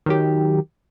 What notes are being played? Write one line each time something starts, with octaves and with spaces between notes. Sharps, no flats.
D#3 F#3 G4